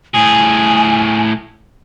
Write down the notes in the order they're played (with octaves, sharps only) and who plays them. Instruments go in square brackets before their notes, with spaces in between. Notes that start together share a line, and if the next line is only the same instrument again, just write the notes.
[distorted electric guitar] A2 G#4 [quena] G#5